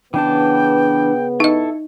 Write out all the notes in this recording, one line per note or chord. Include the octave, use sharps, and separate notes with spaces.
C#3 E3 B3 D4 G5 A5
D#4 E4 A4 D#5